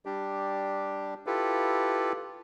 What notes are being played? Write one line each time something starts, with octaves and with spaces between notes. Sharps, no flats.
G3 D4 G4
E4 F4 G4 A4 B4